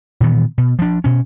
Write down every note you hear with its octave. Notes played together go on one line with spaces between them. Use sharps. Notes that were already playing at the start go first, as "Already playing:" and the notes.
A#2 D#3 E3 B3
B2
F3 D4
B2 C#4